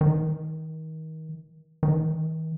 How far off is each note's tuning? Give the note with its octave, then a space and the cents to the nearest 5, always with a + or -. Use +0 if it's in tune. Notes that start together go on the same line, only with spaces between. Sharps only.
D#3 +30
D#3 +45